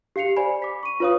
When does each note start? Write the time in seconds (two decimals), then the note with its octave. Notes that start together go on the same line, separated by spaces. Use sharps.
0.16 G4 F5 C7 C#7 F7
0.37 C5 D5 G#5 B5
0.62 D6 B6
0.83 C#6 D#7
1.00 F4 B4 C#5 F5 D#6